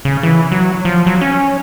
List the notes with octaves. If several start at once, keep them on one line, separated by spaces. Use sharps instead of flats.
C#3
E3
F#3
F3
F#3
C#4